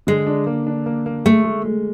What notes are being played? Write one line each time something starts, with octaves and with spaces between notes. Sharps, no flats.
D3 G#3
D4
A#3
D4
A#3
A#3
G#3 A3
G#3
G#3